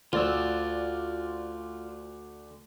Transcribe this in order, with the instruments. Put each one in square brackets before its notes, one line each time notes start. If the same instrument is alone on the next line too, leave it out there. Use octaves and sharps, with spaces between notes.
[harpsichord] D2 [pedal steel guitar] F4 D5 E6